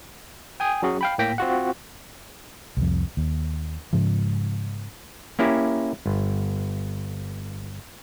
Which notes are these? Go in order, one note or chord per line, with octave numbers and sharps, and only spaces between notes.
G5 G#5 D#6
F#3 C#4 F#4 G#4
F5 G5 B5
A2 A#3 G5 A#6 B6
C4 F4 F#4 F#5
C2 F2
D#2
G#2 C#3 F3
A#3 C#4 E4 G4
G1